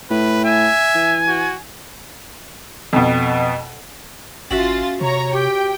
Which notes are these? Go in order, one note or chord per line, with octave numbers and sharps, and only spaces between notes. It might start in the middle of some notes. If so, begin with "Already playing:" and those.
A2 B4
E5 G#5
E3
F#4
F2 B2
G#1 C#4 F4 F#4 E5 A6
C3 C#5 A#5
G4 G5